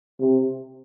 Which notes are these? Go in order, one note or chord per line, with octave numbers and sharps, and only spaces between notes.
C3